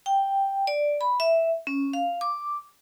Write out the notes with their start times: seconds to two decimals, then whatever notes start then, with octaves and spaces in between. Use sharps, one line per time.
0.06 G5
0.67 D5
1.01 B5
1.20 E5
1.67 C#4
1.93 F5
2.21 D6